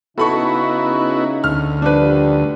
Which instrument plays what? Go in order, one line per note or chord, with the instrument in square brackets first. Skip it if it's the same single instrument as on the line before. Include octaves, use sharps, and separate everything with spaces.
[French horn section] C#3 D#4 [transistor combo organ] B3 E4 F#4 [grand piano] A4 B5 C#6
[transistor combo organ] D2 [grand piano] F6
[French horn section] D#3 F3 G3 [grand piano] D4 B4